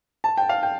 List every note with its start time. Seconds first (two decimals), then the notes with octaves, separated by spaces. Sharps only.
0.24 A5
0.37 G5
0.49 F5
0.63 G5